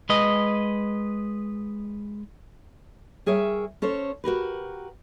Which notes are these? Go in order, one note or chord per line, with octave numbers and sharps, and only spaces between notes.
G#3 B4 D#5
G3 G#4 A#4 C#5 E5
C#4 A4 C5 C#5
F#4 G4 A#4 B4